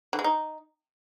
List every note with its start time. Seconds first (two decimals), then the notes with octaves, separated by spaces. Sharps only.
0.13 D3
0.19 G#3
0.24 D#4